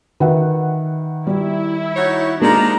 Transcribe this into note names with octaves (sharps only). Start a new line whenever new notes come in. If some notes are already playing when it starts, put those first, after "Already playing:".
D#3 B4 E5 F#5
G3 E4
D#4 F#4 C#5
F3 G3 G#3 A#3 D4 D#4 A#5